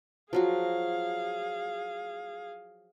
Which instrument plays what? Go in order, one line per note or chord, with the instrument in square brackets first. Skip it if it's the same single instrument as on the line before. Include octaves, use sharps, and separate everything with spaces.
[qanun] F3 F#3 F#4 [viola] G#4 F5